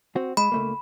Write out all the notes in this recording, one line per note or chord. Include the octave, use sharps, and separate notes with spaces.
C4 F#4
G#3 B5
C#2 A3 A#3